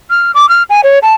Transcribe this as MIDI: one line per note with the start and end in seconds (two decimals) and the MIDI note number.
0.10 0.32 89
0.35 0.48 86
0.49 0.63 89
0.70 0.81 80
0.84 0.99 73
1.02 1.15 81